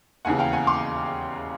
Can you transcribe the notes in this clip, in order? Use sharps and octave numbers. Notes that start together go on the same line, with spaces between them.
E1 D#2 C#3 E3 F#5 G#5
F5 G5
F#5 G#5
C6 D6